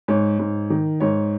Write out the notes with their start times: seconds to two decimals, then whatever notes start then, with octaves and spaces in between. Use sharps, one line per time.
0.08 G#2 C#5
0.39 G#2
0.70 D#3
1.00 G#2 C#5